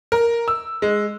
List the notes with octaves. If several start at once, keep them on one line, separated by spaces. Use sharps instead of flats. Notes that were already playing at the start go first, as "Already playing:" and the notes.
A#4
E6
G#3